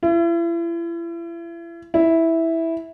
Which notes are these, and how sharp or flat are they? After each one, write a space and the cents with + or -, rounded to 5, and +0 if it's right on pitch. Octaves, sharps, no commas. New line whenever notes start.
E4 +40
E4 -5